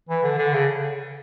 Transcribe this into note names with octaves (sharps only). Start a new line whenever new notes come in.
E3
D3
D3
C#3